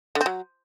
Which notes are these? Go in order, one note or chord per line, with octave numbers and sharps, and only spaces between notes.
D3
C4
F#3